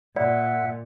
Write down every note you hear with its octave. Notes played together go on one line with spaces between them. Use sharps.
A#2 D5 E5 F#5